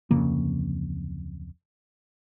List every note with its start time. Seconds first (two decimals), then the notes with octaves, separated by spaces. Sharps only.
0.11 D1 F2 C#3 A#3